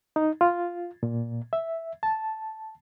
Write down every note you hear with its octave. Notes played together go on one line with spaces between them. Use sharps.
D#4
F4
A#2
E5
A5